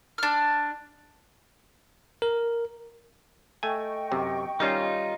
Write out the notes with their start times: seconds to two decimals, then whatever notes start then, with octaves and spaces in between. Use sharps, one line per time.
0.18 D4 F6
2.22 A#4
3.63 A3 D#5 G5 G#5 C#6
4.12 F#2 C3
4.60 D#3 G3 C#4 D#4 F4